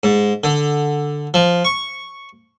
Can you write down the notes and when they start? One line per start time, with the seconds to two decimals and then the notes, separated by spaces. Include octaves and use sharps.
0.03 G#2
0.44 D3
1.34 F3
1.65 C#6